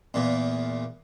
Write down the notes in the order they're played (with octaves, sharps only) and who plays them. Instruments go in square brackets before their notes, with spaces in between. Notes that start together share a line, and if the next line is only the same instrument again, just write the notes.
[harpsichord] E2 A#2